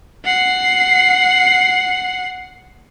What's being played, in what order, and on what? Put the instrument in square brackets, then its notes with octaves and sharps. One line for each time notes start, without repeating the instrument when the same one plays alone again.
[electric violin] F#5 C7